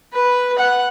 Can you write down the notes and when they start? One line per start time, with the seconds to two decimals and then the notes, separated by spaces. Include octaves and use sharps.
0.13 B4
0.58 F#5